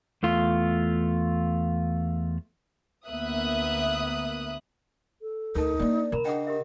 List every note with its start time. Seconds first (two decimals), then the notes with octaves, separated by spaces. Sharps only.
0.23 E2 A3 F4
3.08 D2 A#3 B3 E5 D#6 F#6
5.22 A4
5.55 D2 D#4 A#4 A5
5.79 A#3 D4 D5
6.12 C#3 A#4 A#5 B5
6.25 D4 G#4 D#5 F#5 G5
6.47 G4 A#4 E5